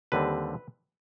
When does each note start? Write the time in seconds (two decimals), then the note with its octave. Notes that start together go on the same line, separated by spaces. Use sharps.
0.12 D#2 D3 G3 C4 B4